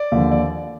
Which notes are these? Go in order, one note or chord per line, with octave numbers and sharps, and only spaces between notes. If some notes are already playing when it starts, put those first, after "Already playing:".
Already playing: D5
D#2 D3 F3
D5